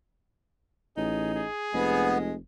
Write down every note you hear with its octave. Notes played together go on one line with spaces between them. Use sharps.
A1 D#4 G#4
G#4
F1 G#3 B3